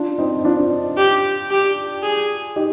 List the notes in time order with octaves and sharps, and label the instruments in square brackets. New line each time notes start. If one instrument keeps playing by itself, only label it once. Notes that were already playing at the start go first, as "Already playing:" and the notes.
Already playing: [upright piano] D4 F4
C4 D#4
D4 F4
[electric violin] G4
G4
G#4
[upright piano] D#4 G4